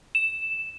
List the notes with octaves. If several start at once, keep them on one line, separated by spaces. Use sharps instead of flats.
E7